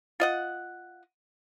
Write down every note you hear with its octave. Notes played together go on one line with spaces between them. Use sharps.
F4 D#5 F#5